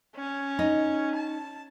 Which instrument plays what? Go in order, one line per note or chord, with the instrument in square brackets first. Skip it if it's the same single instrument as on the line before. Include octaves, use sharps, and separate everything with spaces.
[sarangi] C#4
[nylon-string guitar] D#4
[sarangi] A5